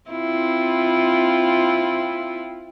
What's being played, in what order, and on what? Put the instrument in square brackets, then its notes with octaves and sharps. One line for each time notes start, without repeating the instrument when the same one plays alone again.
[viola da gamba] C4 E4 F4